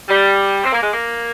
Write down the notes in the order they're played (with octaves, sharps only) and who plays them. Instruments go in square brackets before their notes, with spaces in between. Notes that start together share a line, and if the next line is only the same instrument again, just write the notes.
[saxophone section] G3
C4
A#3
G#3
A#3